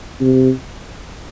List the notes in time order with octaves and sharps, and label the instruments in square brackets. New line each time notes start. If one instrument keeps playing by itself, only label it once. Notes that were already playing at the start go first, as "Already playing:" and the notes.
[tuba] C3